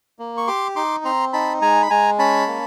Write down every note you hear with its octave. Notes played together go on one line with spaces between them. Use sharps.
A#3
C#6
G4 C6 D6
D#4 C6 D6
C4 A#5 C6
D#4 A5 B5
G#3 G#5 A#5
B5
G#3 G#5 A#5
C#4 A5 B5
A#3